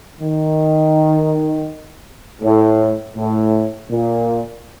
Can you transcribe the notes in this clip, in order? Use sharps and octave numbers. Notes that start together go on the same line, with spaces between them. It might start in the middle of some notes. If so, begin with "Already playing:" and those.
D#3
A2
A2
A#2